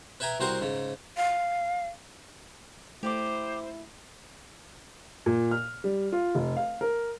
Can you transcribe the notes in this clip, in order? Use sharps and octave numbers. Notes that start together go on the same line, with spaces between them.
B4 E5 G5 G#5 A#5
C2 C4 F#4 A#4 C5 F#5
G#2 C#3
F5
A3 E4 G4 C5 D5 D6
A#2
F6
G3
F4
F1
F5
A#4